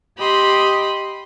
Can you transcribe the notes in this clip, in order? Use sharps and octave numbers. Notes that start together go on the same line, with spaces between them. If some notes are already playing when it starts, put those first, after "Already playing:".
G4 D#5 B5 C6